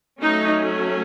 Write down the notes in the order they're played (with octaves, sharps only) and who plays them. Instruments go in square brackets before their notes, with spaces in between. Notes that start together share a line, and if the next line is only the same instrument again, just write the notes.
[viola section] F#3 A3 C#4 D#4